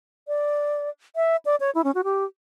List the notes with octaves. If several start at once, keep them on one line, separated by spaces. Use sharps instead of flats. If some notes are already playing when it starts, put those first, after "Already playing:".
D5
E5
D5
C#5
E4
C#4
F#4
G4